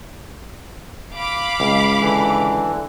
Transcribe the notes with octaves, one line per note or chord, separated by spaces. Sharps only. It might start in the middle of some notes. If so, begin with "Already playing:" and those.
F5 B5 D6
C#2
D3 E3